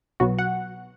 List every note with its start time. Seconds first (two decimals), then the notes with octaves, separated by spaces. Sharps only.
0.20 B1 B2 F#3 B3 F#4
0.39 F#5